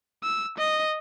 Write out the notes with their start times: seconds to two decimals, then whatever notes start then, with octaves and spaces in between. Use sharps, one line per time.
0.23 E6
0.58 D#5